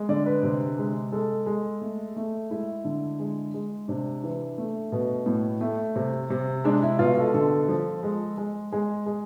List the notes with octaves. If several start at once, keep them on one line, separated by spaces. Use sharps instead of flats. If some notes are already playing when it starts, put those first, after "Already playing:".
Already playing: G#3
D3 D5
B4
C3
G#3
G#3 A4
G#3
A3
A3
G#3 E4
D3
G#3
G#3
C3 D4
E3
A3
B2
A2
A3
C3
C3
G#3 D4
E4
B2 F4
A4
D3 A4
F3
G#3
G#3
G#3 G#4
G#3